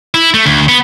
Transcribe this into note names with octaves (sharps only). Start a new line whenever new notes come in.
E4
A3
D2
B3